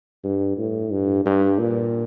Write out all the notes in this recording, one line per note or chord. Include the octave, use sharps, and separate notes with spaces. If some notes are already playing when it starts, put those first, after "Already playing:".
G2
A2
G2
G2
A#2